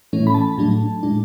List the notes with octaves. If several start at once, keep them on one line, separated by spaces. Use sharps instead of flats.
A2 E3 A3 C#4
B5
A5
A2 F#3 A3 D4
A2 G#3 D4